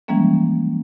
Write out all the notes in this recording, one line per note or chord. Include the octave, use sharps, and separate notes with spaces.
E3 F3 G3 G#3 A#3 C#4